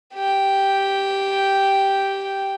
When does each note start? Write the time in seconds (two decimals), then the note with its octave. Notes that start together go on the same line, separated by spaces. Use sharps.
0.15 G4 G5